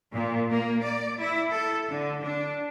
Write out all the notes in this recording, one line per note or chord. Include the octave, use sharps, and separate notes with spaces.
A#2
A#3
D5
E4
A4
D3
D4